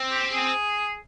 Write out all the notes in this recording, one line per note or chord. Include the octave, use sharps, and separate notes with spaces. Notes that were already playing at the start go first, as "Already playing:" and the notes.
Already playing: C4
G4
G#4